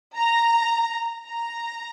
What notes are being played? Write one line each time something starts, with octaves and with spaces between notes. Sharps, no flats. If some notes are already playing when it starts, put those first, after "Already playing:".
A#5
A#5